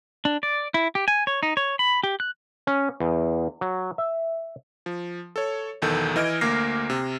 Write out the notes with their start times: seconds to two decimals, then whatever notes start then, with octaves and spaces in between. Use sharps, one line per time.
0.25 D4
0.43 D5
0.74 E4
0.95 G4
1.08 G#5
1.27 C#5
1.43 D#4
1.57 C#5
1.79 B5
2.04 G4
2.20 F#6
2.67 C#4
3.00 E2
3.61 F#3
3.98 E5
4.86 F3
5.36 A4 C#5
5.82 B1 E2 D#3 A4 G6
6.16 E3 D#5 F6 G#6 D7
6.41 D2 A#3 D6 F6 A#6 C7
6.90 C3